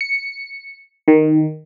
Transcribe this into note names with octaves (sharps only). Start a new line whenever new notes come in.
C#7
D#3